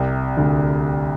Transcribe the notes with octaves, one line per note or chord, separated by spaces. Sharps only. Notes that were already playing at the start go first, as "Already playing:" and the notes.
Already playing: C2 C3
D2 D3